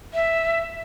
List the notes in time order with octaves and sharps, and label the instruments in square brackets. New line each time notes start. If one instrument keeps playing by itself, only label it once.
[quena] E5